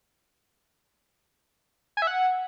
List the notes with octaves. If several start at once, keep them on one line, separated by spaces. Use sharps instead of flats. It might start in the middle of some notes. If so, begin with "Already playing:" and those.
G#5
E5
F#5